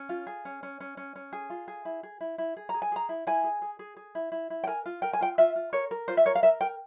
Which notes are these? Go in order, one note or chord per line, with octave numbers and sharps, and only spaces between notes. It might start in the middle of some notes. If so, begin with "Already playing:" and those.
Already playing: C#4
F4
G#4
C#4
C#4
C#4
C#4
C#4
G#4
F4
G#4
E4
G#4
E4
E4
G#4
A#5
G#4
G#5
G#4 A#5
E4
E4 G#5
G#4
G#4
G#4
G#4
E4
E4
E4
G5
A#4 G#5
F4
A#4 G5
G#5
F4 G5
F4 E5
F4
A#4 C#5
A#4
F4 C5
E5
A#4 C#5
F5
A#4 E5
A#4 G5